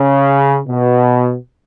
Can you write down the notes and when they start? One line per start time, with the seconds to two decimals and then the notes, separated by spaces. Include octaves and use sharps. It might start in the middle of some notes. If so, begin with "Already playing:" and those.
Already playing: C#3
0.68 B2